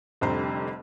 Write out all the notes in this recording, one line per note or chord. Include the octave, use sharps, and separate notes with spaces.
F1 F2 D3 G3 C5 A#5